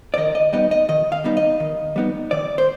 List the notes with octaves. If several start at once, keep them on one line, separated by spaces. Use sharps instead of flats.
D5
D#3 D#5
D#5
G3 B3 D#4 D#5
D#5
D#3 D#5
F5
G3 B3 D#4
D#5
D#3
G3 B3 D#4
D#3 D5
C5